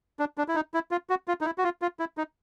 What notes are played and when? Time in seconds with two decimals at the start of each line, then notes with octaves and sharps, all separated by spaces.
0.19 D4
0.38 D4
0.48 E4
0.55 D#4
0.74 E4
0.91 F4
1.10 F#4
1.28 F4
1.41 D#4
1.45 E4
1.58 F#4
1.64 F4
1.82 F4
1.99 E4
2.18 D#4